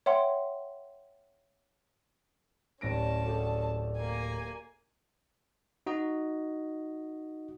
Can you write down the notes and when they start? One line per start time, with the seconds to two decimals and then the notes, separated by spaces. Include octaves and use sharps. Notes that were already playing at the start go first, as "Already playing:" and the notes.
0.06 C#5 E5 F#5 G5 C6
2.81 D1 G3 C#4 D4 C#5 A5 A#6 D7
3.26 F#4 G#4 A4 D5 F5 G5
3.96 A#3 G#5
5.86 D#4 F#4 D#5